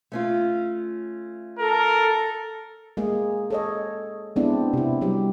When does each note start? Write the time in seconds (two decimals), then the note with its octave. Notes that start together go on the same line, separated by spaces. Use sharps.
0.12 A3 C#4 F4
1.59 A4 A#4
2.97 G#3 A#3 G#4
3.50 A4 C#5 D#5
4.36 G#3 B3 C4 D4 E4
4.73 C3 E4
5.01 F#3 G3 G4